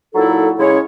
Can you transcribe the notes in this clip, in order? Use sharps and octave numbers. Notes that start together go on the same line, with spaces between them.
A#2 F#3 D#4 E4 A4
C#3 G#3 C#4 E4 C#5